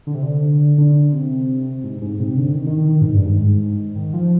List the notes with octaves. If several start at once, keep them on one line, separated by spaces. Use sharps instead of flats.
D3
C3
D3
D3
C3
G#2
G#2
C3
D3
D#3
D#3
D#3
D#3
G#2
G2
G#2
D#3
F3